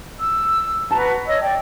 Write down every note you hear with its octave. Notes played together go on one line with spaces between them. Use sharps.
E6
F#4 B4 A5 A#5
C#5 D#5 E6
D5 G5